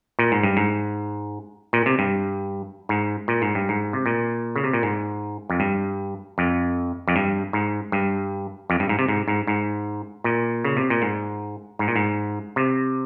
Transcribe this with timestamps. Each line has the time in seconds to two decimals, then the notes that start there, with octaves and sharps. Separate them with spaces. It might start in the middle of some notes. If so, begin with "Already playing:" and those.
0.19 A#2
0.32 G#2
0.43 G2
0.57 G#2
1.73 A#2
1.86 C3
1.99 G2
2.89 G#2
3.28 A#2
3.42 G#2
3.55 G2
3.69 G#2
3.93 C3
4.06 A#2
4.56 C#3
4.64 C3
4.73 A#2
4.83 G#2
5.50 F2
5.60 G2
6.38 F2
7.08 F2
7.16 G2
7.53 G#2
7.92 G2
8.70 F2
8.80 G2
8.89 G#2
8.99 C3
9.08 G#2
9.28 G#2
9.47 G#2
10.24 A#2
10.64 C#3
10.77 C3
10.90 A#2
11.02 G#2
11.79 G#2
11.88 A#2
11.96 G#2
12.56 C3